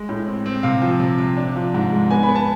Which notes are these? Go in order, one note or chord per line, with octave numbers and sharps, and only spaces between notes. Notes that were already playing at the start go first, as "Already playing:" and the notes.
Already playing: G#3
A2
C4
C4
C3 F5
F3
C3
C3
D4
F3
G#2
G#3
B3 G#5
B5
B3
A5